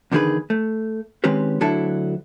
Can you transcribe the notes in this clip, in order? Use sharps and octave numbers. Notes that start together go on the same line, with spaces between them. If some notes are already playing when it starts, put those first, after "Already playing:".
E2 D3 D#3 D4 G#4 B4
A3
D#3 G#3 C4 C#4 G4 B4
D2 F#3 D4 E4 A4 A5